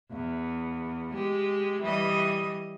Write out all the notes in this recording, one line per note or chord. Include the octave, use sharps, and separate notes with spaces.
E2
G#3 G4
E3 G3 D#5